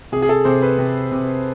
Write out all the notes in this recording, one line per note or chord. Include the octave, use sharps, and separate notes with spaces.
C3 G#4
G#4
A4
C3 C5
B4
C3
C3